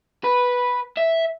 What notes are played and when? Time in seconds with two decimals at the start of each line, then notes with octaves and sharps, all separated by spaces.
0.24 B4
0.97 E5